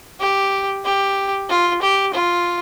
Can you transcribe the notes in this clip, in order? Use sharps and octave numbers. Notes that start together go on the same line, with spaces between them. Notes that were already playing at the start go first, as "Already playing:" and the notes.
G4
G4
F4
G4
F4